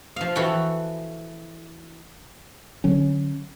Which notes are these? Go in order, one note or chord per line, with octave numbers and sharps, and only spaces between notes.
F3 F5
E3 F#4 A4 F#5 G5
D3 F#3 C#4